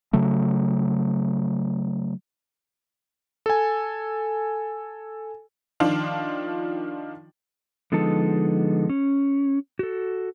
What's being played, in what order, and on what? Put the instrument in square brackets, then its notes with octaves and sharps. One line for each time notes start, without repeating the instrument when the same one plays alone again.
[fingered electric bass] C#3 F#3 A3
[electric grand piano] A4 G#5
[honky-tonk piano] D#3 F3 D4 F4
[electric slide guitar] D3 F3 G#3 B3 D#4 A4
C#4
F#4 A4